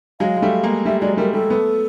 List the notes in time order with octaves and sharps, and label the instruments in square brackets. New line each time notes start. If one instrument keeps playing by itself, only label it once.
[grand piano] F#3 G#3 [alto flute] F5
[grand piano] G#3
G3 A3
G#3 A#3
[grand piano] G3 A3 [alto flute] E5
[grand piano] F#3 G#3 [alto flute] D5
[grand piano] G3 A3 [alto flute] A#4
[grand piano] G3 A3 [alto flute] A4
[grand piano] A3 B3